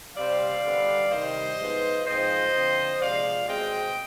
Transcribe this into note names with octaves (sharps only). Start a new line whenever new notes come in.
C3 G3 C4 D5 F5
D3 G3 B3
C3 D#3 G3 C5 D#5
G#2 F3 B3
G#2 F3 C4 C5 D#5
D3 F3 C4
C3 F3 G#3 D5 F5
B2 G#3 C4 D#5 G5